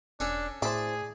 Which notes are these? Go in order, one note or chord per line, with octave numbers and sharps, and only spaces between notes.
E1 C#4 D4 A4 C#5
A2 E3 G#4 C5 D5 A5 B5